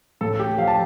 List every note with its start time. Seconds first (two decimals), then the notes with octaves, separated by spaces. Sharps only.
0.21 A2 A4
0.39 G4
0.58 F3 F5
0.68 A5